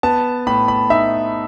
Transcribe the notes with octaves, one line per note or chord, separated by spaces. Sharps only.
B3 A5
A2 B5
B5
D#4 E5